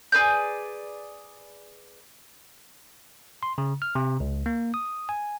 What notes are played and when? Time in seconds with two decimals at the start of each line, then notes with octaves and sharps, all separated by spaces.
0.12 G#4 B4 D5 G6
3.43 C6
3.58 C#3
3.82 F6
3.95 C3
4.20 C#2
4.46 A#3
4.74 D#6
5.09 G#5